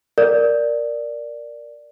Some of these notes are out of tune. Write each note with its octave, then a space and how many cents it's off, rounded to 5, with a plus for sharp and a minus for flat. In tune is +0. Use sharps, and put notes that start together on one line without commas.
A#4 +0 D5 +0